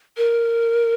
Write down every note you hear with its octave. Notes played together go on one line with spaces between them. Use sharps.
A#4